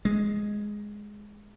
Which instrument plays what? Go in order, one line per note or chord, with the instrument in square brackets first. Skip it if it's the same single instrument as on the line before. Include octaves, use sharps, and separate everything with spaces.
[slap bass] G#3